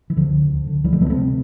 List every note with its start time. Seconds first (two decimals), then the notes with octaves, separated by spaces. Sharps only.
0.10 E3
0.16 D2 D3 F3
0.34 D2
0.50 D3
0.67 D3
0.84 D2 E3 G3
0.93 F3 A3
1.01 D2 G3 B3
1.10 A3 C4
1.18 C3